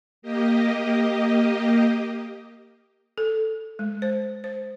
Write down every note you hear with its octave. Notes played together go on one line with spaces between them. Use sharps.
A#3 G4 D#5
A4
G#3
C5
C5